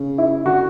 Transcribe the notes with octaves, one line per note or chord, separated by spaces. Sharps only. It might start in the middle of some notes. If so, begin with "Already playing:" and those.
Already playing: C#3
E4
D3 F#4